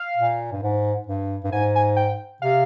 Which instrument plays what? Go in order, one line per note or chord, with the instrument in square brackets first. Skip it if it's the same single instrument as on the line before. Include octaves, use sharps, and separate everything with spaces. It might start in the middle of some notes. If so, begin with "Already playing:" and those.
Already playing: [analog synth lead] F5
[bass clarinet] A#2
G2
G#2
G2
G2
[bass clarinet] G#2 [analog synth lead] G#5
[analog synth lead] G#5
G5
[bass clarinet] C3 [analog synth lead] F5